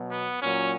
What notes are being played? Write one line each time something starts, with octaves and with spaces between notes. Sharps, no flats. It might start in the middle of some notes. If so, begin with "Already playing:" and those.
Already playing: B2 F#3
B3
A#2 F#3 C#4